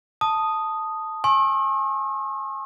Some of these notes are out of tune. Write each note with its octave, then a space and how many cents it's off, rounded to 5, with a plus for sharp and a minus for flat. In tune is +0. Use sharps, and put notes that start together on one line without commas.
A5 +0 D#6 -5
G#5 +20 C#6 -45 E6 +5